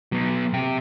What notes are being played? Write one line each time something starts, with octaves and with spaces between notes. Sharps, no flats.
F#3 B3
C3 G5